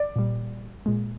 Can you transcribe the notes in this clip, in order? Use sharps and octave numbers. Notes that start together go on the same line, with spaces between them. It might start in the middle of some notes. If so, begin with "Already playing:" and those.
Already playing: D5
A#2 G3
A#2 G#3